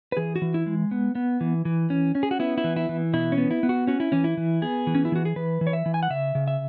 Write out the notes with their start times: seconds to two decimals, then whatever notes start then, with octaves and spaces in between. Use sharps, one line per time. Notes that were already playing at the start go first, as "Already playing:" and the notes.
0.12 B4
0.17 E3 G#4
0.36 F#4
0.42 E3
0.54 E4
0.66 G#3
0.91 B3
1.15 B3
1.41 E3
1.65 E3
1.90 C#4
2.15 C#4
2.23 G#4
2.31 F#4
2.39 B3 E4
2.58 E4
2.64 E3
2.76 E4
2.89 E3
3.13 B2 E4
3.32 C#4
3.38 B3
3.51 E4
3.63 B3
3.69 F#4
3.87 C#4 F#4
4.00 E4
4.12 E3 C#4
4.24 E4
4.37 E3
4.62 B3 G#4
4.87 E3
4.95 C#4
5.05 E4
5.12 E3 F#4
5.25 G#4
5.36 E3 B4
5.61 E3
5.67 C#5
5.73 E5
5.86 E3
5.94 G#5
6.03 F#5
6.10 C#3 E5
6.35 C#3
6.48 E5